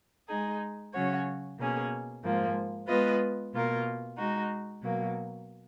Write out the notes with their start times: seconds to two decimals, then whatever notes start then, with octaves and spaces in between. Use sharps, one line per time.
0.29 G#3 D#4 G#4
0.93 C#3 F#3 C#4 F#4 C#5
1.58 B2 A#3 C#4 G#4
2.23 G#2 F3 A#3
2.88 G#3 B3 F4 B4 D#5
3.52 B2 A#3 F4 A#4
4.17 G#3 D#4 F#4
4.82 B2 F#3 A#3